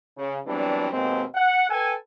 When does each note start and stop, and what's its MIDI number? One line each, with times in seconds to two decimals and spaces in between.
0.18 0.38 49
0.46 0.90 52
0.46 0.90 54
0.46 0.90 55
0.46 0.90 59
0.46 0.90 60
0.46 0.90 62
0.92 1.23 39
0.92 1.23 47
0.92 1.23 56
0.92 1.23 58
0.92 1.23 60
1.35 1.67 78
1.70 1.94 69
1.70 1.94 71
1.70 1.94 79
1.70 1.94 80